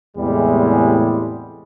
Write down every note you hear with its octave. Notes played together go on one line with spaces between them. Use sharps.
E2 A2 C3 G3 G#3